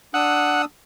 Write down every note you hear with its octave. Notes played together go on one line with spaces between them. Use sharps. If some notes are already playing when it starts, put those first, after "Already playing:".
D4 F#5 D#6 E6